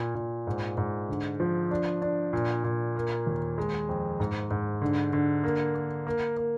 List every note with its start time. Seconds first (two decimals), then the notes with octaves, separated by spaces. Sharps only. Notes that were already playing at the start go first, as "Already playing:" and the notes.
Already playing: A#2
0.15 A#2
0.47 G#2
0.77 G#2
1.09 D3
1.40 F3
1.71 D4
2.02 D4
2.33 A#2
2.64 A#2
2.96 A#3
3.27 D#2
3.58 G#3
3.89 F2
4.20 G#2
4.51 G#2
4.82 D3
5.13 D3
5.44 A#3
5.75 A#3
6.07 A#3
6.37 A#3